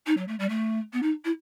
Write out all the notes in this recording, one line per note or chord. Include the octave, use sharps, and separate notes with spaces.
D#4
F#3
A3
G3
A3
B3
D#4
E4